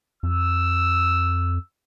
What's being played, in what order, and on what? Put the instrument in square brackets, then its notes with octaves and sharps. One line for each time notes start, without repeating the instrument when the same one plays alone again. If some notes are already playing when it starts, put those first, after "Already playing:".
[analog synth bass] F2 [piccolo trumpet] E6